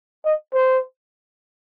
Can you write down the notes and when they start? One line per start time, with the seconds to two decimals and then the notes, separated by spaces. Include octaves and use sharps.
0.25 D#5
0.54 C5